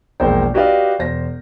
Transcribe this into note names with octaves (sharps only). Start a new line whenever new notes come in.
E1 A#1 G#3 A#3 C5 G5
F#4 G4 B4 D5 D#5 F5
E1 C5 A#6